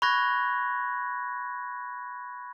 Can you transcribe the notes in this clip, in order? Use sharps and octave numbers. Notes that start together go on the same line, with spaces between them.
B5 C#6 F#6 G#6 A#6